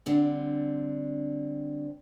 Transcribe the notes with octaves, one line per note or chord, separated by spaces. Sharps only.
D3 G3 C4 D4